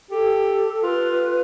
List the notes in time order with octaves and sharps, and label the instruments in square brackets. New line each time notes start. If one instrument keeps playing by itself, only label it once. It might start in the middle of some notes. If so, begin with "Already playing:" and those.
[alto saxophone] G4 [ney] A4
[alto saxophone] F4 [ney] B4